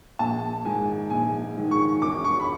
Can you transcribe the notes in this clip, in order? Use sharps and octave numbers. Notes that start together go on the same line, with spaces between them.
A#1 A5
G#2 D#3 G#5
A#1 G#5
G#2 D#3
C#6
E1 D6
C#6
B5